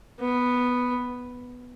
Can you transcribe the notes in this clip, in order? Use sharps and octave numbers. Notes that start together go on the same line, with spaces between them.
B3